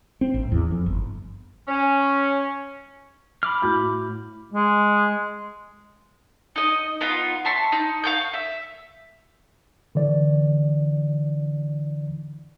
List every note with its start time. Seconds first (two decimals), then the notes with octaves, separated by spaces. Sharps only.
0.21 C4
0.34 A1
0.52 E2
0.71 F2
0.86 G1
1.68 C#4
3.43 B5 D6 F6
3.62 A2 F#4 G6
4.53 G#3
6.56 D#4 D#5
7.01 B3 D#4 F4
7.45 E5 A5 C6 C#6
7.72 D#4
8.04 F5 C#6 G6
8.34 E5
9.95 D3 E3 D5